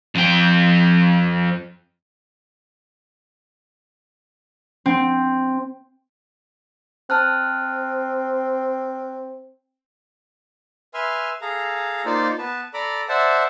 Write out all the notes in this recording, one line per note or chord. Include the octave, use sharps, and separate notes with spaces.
F2 G5
C4
C4 A5 F6 F#6
B4 E5 G#5 C6 F6
G#4 A4 F5 A#5
A#3 D#4 F4 C5 D5
B3 B4 A5
A4 D5 A#5 B5 D6
C5 D5 E5 F#5 A5